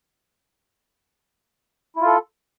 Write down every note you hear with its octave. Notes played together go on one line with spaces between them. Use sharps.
E4 F4 A4